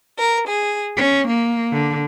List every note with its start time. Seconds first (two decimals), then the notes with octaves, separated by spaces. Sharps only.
0.19 A#4
0.48 G#4
0.97 C#4
1.28 A#3
1.74 D3